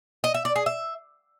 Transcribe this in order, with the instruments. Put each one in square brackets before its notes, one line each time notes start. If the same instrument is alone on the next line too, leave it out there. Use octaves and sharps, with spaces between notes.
[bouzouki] D#5
E5
D5
G#4
E5